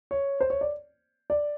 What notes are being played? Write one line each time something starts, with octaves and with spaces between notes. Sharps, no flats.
C#5
C5
C#5
D5
D5